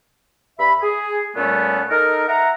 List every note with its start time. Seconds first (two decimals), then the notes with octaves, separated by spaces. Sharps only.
0.59 G2 E5 B5
0.82 G#4
1.35 A#2 G3 A3 B3 C#4
1.90 D#4 A4 A#4
2.28 E5 F#5 A#5